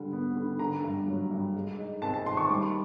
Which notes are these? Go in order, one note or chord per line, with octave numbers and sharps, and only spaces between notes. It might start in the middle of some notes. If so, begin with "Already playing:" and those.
Already playing: D3 G3
B3
D3
D3 A#5
G2
F#3
G2
G#3
D#4
C4 A5
A5
D#3 C6
C#6
G3 D6